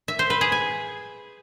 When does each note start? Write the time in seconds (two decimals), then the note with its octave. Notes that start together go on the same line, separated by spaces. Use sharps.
0.08 E5
0.19 C5
0.30 B4
0.41 G#4
0.52 G#5